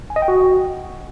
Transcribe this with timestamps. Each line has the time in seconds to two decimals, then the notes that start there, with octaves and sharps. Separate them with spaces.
0.10 G#5
0.16 D#5
0.22 G5
0.28 F#4